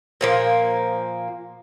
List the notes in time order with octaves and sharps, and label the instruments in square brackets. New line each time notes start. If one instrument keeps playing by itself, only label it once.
[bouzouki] A#2 F3 A#3